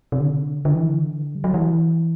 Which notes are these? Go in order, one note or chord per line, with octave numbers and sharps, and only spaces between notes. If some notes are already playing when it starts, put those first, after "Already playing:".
C3
D3
D3
E3
D3
G3
F#3
E3